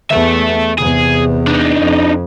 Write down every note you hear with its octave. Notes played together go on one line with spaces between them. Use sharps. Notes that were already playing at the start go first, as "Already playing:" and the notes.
E2 A4 E5
E2 C3 G#4
D4 D#4
F2